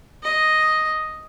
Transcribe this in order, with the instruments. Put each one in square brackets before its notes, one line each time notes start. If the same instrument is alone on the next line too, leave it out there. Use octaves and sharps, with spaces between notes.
[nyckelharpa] D#5